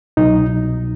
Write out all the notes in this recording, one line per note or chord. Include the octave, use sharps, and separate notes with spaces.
C2 B2 F#3 D#4